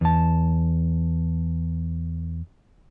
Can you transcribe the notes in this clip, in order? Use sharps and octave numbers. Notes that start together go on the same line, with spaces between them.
E2 A5